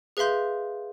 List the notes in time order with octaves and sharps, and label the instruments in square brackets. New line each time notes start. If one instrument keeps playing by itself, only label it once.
[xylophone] G#4 B4 E5 F5 C6 G6